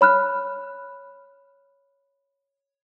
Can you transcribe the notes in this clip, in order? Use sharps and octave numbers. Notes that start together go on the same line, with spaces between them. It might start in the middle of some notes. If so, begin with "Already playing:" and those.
C#5 B5 F6 F#6